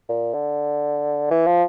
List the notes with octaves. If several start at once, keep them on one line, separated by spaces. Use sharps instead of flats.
A#2
D3
E3
F3